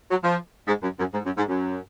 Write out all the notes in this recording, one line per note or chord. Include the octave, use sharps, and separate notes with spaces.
F#3
F3
G#2
F#2
F#2
G#2
F#2
G#2
F#2